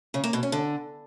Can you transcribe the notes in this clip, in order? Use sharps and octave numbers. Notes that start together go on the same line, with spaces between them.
C#3
A#3
B2
C#4
D3